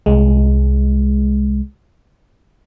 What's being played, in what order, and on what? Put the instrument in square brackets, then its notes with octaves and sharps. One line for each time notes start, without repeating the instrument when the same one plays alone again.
[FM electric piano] C2 G#3